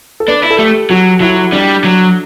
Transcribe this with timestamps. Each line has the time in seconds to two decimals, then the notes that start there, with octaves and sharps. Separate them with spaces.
0.20 A4
0.27 D4 B4
0.43 E4
0.51 A4
0.58 A3 G4
0.90 F#3 F#4
1.21 F#3 E4
1.52 G3 D4
1.84 F#3